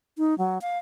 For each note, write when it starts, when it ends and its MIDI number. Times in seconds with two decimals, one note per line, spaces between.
0.18 0.37 63
0.38 0.58 54
0.62 0.78 77